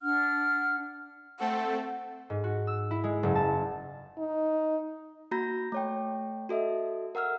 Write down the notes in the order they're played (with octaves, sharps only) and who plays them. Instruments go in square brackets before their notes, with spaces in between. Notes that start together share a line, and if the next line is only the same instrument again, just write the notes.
[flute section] D4 F#5 F6
[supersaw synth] A3 C4 A4 [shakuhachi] F#5
[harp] G#2
F#4
E6
E4
G#3
F#1
A5
[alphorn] D#4
[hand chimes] A#3 F#4 A#5 B5 G6 A#6
A3 C#5 G5
F#4 A4 D#5 E5
A#4 F#5 E6 F6